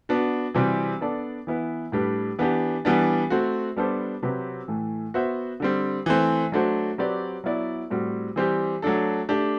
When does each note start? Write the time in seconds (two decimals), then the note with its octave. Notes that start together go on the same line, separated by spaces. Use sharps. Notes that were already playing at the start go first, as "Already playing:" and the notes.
0.09 B3 D4 F#4
0.54 C3 E3 G3 C4 F#4
1.01 B3 D4 A4 D5
1.47 E3 B3 E4 B4
1.92 A2 G3 D4 G4 B4
2.39 E3 B3 D4 G4
2.85 E3 G3 B3 D4
3.30 A3 C4 F#4
3.76 G3 B3 D4 A4 C5
4.23 C3 F#3 C4 G4 B4
4.68 A2 E3 A3
5.14 B3 F#4 C5 E5
5.60 D3 G3 C4
6.06 E3 A3 C4
6.52 F#3 A3 D4 F#4 C5
6.98 F#3 C4 G4 B4 D5
7.44 F#3 B3 E4 B4 D5
7.90 A2 G3 C4 F#4
8.36 E3 G3 C4 G4
8.82 F#3 A3 D4 A4
9.29 A3 D4 G4